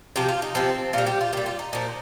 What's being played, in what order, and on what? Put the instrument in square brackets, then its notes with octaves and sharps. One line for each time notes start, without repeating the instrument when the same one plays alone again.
[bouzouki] C3 F3 G4
F4
D#4
C3 F3 C4
A#2 G3 F4
G4
F4
A#2 G3 G4
F4
D#4
A#2 F3 D#4